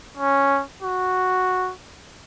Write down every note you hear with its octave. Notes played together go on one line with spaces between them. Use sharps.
C#4
F#4